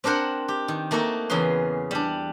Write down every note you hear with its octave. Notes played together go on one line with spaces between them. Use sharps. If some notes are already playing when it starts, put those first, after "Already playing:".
C4 D4 A#4 C5 F#5
G4
D#3
A3 A#3 D#4 F#4 A4
E2 C#3 G#4 B4 C6
G3 D4